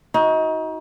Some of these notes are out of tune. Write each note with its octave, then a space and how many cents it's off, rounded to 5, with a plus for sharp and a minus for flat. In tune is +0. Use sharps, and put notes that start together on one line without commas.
D#4 +30 F#4 +0